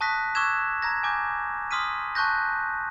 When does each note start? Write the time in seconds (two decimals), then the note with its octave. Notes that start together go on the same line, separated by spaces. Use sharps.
0.01 A5 C#6 D#6 F#6 A#6 B6
0.35 C#6 D6 E6 F#6 G#6 E7
0.82 A#5 G#6 A#6
1.03 G#5 D6 G6
1.71 C6 D#6 F6 B6 D#7
2.15 A5 C#6 F#6 G6 A#6